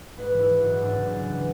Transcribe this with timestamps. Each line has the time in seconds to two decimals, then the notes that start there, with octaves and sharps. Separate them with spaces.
0.17 G#2 B4
0.34 E3
0.39 E4
0.49 E3
0.60 G#2 F#4
0.81 F#2 D4
0.97 C#3
1.13 F#2
1.29 E3